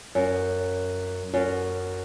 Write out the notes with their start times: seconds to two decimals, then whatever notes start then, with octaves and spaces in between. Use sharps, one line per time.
0.15 F#2
1.34 F#2